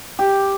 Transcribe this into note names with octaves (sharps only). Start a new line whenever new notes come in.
G4